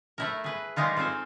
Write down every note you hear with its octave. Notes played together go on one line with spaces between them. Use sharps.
A3 E4 A#4
G#4 B4
D#3 G3 G#3 D#4 F4
C4 F4 A4 C5 G#5